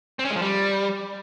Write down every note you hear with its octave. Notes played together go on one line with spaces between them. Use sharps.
C4
C#4
G#3
F3
G3